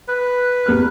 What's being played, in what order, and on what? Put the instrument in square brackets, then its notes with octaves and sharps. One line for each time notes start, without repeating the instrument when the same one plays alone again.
[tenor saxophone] B4
[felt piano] E2 G4 F6